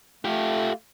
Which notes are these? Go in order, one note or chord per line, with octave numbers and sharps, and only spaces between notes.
A3 F4 G4